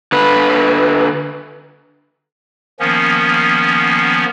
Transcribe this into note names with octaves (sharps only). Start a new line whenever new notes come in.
D3 B4
D#3 F3 A#3 B3 C#4